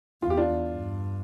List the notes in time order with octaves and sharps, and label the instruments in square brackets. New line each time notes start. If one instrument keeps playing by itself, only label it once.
[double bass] E2 [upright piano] F4
[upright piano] G4
D4 F4
[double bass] G2